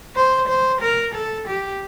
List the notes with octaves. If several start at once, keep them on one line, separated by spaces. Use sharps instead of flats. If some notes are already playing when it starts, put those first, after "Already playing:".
C5
C5
A#4
A4
G4